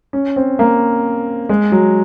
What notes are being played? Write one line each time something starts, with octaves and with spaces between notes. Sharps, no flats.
C#4
C4
A#3
G#3
F#3